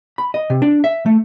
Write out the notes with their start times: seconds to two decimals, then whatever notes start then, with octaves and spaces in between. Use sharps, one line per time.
0.18 B5
0.34 D#5
0.50 C3
0.62 D4
0.84 E5
1.06 A3